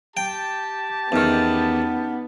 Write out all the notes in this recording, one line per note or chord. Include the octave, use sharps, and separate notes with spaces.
G4 G5 A5
E2 D#3 B3 C#4 D#4 F6